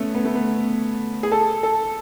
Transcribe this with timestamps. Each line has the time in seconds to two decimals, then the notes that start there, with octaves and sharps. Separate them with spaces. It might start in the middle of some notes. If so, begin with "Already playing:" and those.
Already playing: A3 B3 C#4
0.15 B3
0.25 A3
0.35 B3
1.23 G#4
1.32 A4
1.63 A4